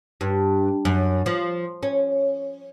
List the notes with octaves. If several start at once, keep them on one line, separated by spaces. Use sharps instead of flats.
G2
F#2
F3
C#4